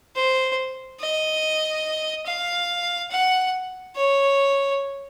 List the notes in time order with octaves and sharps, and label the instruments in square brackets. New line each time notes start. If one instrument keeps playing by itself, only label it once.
[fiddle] C5
D#5
F5
F#5
C#5